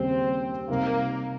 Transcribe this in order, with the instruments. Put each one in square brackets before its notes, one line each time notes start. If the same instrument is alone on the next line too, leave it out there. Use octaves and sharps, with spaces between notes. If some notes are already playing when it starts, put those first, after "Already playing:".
Already playing: [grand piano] D#2 C#3 G3 [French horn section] C4
[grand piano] C3 G3 C4 D#4 G4 [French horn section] A#3